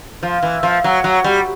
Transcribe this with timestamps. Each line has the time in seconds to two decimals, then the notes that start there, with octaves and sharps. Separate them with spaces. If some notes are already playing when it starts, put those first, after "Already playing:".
0.23 F3
0.43 E3
0.63 F3
0.84 F#3
1.04 F#3
1.24 G3